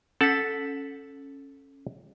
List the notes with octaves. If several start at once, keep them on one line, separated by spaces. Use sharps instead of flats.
C#4 A4 F#5 A5 B6